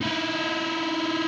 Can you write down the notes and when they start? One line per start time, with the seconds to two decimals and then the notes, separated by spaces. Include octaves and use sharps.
0.01 D#4 E4